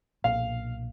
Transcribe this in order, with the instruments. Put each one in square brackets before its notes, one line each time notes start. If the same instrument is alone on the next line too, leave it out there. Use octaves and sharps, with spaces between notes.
[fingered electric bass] B1 A#2 [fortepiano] F5